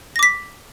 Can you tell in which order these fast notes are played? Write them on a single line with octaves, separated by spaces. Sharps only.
A#6 D6 B6